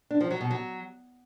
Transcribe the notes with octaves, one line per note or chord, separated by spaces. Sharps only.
D4
F3
F#3
B2
F#3